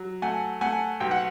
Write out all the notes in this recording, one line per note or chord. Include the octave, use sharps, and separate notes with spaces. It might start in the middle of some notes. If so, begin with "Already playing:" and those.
Already playing: F#3
A3 F#5 G#5
A3 F#5 G#5
B1 G5
F#5